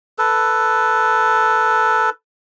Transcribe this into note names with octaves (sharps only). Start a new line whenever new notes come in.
A4 B4